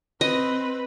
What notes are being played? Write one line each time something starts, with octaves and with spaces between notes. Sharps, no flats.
C4 B4 D#5